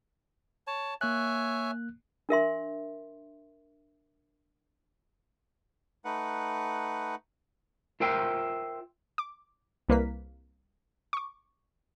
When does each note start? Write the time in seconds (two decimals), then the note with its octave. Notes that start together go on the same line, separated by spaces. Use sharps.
0.67 C#5 A5
1.01 A#3 C#5 E5 G#5 F#6
2.29 D4 A#4 E5 C6
6.05 A3 D#4 B4 F#5
8.00 F4 A#4 C5 E5 G5
9.18 D6
9.89 C2 A#3 A#4 B4 B6
11.13 C#6 D6